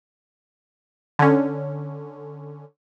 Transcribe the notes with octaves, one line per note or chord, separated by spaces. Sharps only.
D3 C#4